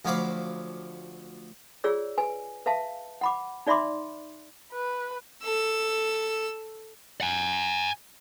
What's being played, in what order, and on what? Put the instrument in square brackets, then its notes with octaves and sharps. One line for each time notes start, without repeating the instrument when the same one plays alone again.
[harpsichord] D2 F3 F#3 F5 B5 D6
[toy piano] F4 G#4 C#5 D5 E6
B4 G#5
B4 E5 F5 A5
F#5 B5 D6
D#4 D5 E5 B5 C6 D6
[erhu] B4
[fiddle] A4 E6
[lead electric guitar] F#5 G#5